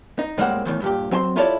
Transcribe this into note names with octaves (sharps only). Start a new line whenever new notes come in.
D#4
A2 G3 G#3 A#3 C4 F#5
E2 A2 D#3
G2 A#2 G4
F#3 C4 G#5 C6
E4 F4 G4 A4 C#5 D5